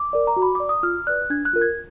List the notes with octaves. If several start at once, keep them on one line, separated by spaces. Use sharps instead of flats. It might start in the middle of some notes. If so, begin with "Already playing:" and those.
Already playing: D6
A#4 D5
A#5
F#4
B5
D5 D6
D#6
F4 F6
B4 D5 F#6
D4 G#6
F#6
F4 A#4
G#6